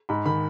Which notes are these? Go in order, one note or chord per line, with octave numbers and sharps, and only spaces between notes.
G#2 B5
D#3 B5